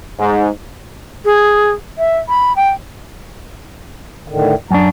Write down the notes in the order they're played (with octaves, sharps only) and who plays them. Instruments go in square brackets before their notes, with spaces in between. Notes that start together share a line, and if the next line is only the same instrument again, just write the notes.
[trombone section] G#2
[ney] G#4
E5
B5
G5
[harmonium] A2 D3 D#3
[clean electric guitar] F#2 D4 [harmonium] A#5